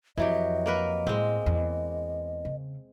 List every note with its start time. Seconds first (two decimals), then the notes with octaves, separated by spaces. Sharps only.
0.17 F2 E3 F#3 G4 D#5
0.66 A#3 A#4 B4
1.07 A2 G#3 C4
1.46 E2
2.45 C#3